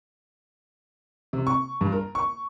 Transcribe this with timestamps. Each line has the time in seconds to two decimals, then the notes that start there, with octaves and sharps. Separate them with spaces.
1.33 C3
1.47 C#6
1.81 G2
1.92 A#4
2.15 C#6